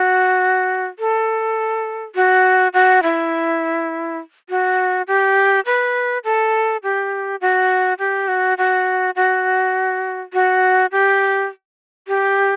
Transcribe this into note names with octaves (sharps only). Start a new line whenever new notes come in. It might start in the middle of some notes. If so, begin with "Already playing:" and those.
Already playing: F#4
A4
F#4
F#4
E4
F#4
G4
B4
A4
G4
F#4
G4
F#4
F#4
F#4
F#4
G4
G4